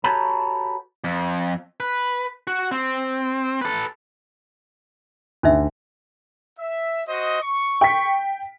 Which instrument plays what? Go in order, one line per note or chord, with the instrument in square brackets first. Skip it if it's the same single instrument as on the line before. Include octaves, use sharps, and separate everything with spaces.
[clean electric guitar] F#4 G4 A4 B4 C#5 A#5
[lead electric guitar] F2
B4
F#4
C4
A4 B4
[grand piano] D2 [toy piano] C#4 D#4 E5
[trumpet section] E5
F#4 C5 D#5
C#6
[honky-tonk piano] G5 B6